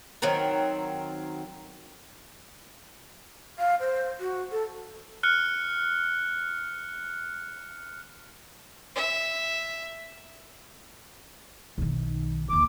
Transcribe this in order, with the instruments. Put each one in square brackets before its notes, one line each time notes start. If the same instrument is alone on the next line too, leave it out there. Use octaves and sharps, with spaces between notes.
[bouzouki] D#3 F#3 C4 A#4
[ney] F5
C5
F#4
A4
[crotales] F6 F#6 C#7
[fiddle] E5
[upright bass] B1 D#3
[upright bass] D#2 D3 [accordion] D6